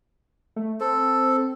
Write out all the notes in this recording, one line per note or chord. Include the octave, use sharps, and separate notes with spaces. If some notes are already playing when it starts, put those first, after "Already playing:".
A3
C4 A4